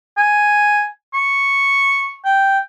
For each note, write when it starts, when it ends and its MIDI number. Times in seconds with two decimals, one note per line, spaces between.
0.17 0.87 80
1.14 2.17 85
2.25 2.59 79